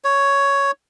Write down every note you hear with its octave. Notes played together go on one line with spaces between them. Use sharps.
C#5